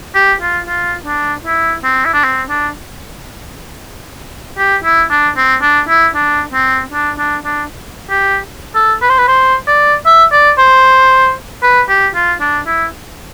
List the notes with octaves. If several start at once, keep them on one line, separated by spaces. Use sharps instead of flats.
G4
F4
F4
D4
E4
C4
E4
D4
C4
D4
G4
E4
D4
C4
D4
E4
D4
C4
D4
D4
D4
G4
A4
B4
C5
B4
C5
D5
E5
D5
C5
B4
G4
F4
D4
E4